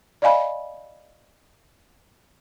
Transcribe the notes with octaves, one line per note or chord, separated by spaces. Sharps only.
D5 D#5 F5 G#5 B5